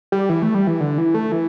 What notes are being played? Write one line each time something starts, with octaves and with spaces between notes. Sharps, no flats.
G3
E3
A3
G3
E3
D3
E3
A3
E3